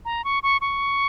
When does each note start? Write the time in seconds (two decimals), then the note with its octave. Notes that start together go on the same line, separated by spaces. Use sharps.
0.05 A#5
0.24 C#6
0.43 C#6
0.61 C#6